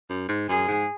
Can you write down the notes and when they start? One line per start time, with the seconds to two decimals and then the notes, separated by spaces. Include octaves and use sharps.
0.09 F#2
0.28 G#2
0.49 F#2 G#4
0.68 G#2